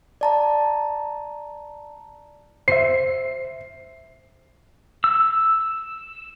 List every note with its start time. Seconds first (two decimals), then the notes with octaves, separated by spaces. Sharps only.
0.21 D5 A5 A#5
2.68 C5 E5 C7
5.04 E6